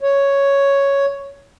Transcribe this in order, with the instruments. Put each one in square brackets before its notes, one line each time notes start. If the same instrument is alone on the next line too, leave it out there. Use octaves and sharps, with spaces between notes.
[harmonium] C#5